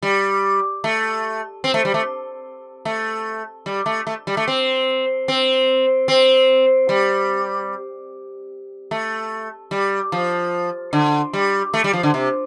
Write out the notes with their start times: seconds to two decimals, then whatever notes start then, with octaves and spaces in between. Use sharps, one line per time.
0.03 G3
0.84 A3
1.64 C4
1.74 A3
1.85 G3
1.94 A3
2.85 A3
3.66 G3
3.86 A3
4.07 A3
4.27 G3
4.37 A3
4.48 C4
5.28 C4
6.08 C4
6.89 G3
8.91 A3
9.71 G3
10.12 F3
10.93 D3
11.33 G3
11.74 A3
11.84 G3
11.93 F3
12.03 D3
12.14 C3